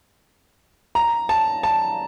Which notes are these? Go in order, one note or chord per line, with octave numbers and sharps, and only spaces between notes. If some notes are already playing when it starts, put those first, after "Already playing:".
A#5
A5
A5